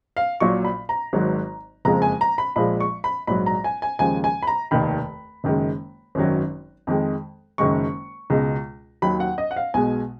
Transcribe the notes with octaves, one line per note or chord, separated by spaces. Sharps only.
F5
A#1 A#2 F#3 C#6
B5
A#5
G#1 G#2 F#3
F#1 F2 F3 G#3 A#5
G#5
A#5
B5
A#1 A#2 F3 G#3 B5
C#6
B5
A#1 G#2 F#3 B5
A#5
G#5
G#5
D#2 C#3 F3 G#3 G#5
G#5
B5
A#5
F1 D#2 D#3 B5
F#1 F#2 D#3 G#3
G#1 F#2 D#3 F#3
F2 D#3 G#3
F#1 F#2 D#3 G#3 C#6
C#2 B2 G#3
D#2 D#3 F#3 B5
F#5
D#5
F#5
F5
B1 B2 G#3 G#5